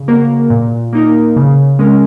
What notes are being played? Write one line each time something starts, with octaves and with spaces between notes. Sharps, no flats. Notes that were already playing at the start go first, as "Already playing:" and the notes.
Already playing: C#3
A#3 F#4 A#4
A#2
A#3 D#4 A#4
C#3
G#3 C#4 A#4